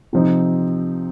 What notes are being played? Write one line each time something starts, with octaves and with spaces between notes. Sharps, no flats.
C3 F3 C4 D#4